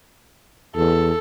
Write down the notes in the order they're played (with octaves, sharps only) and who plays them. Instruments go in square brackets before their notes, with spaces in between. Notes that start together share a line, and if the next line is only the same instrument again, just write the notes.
[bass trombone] E2 [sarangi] A4